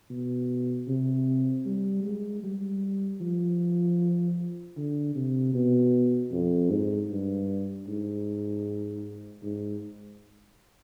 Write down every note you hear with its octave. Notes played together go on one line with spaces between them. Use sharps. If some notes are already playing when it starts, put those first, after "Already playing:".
B2
C3
G3
G#3
G3
F3
D3
C3
B2
F2
G#2
G2
G#2
G#2